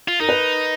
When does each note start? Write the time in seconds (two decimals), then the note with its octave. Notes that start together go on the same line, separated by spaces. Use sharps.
0.08 F4
0.20 D#4 A#4
0.29 B4